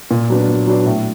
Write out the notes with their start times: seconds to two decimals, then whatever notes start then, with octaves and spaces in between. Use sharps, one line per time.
0.11 A#2
0.30 F#3 B3 D4
0.48 A#2
0.67 F#3 B3 D4
0.86 A2